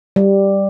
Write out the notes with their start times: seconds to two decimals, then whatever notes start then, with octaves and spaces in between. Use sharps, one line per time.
0.16 G3